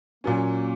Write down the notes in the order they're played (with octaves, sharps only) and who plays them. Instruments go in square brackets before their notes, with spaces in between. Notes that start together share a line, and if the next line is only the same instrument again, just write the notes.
[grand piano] A#2 F#3 C#4 [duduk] A#3